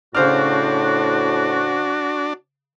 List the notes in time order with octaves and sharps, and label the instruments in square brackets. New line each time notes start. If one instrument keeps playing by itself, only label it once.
[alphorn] A2 [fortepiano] C#3 C5 F6 [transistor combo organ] D4 [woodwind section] F#4